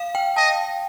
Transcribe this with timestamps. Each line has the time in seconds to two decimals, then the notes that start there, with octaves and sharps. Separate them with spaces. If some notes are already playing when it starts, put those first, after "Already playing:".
Already playing: F5
0.15 G5
0.36 D#5 A5